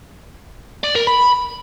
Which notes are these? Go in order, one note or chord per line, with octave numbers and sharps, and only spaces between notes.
D5
A#4
B5